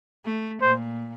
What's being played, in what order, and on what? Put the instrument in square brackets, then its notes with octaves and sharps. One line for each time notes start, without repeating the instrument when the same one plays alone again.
[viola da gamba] A3
[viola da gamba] A#2 [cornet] C5